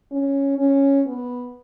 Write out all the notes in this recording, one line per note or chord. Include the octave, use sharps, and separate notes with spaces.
C#4
C#4
B3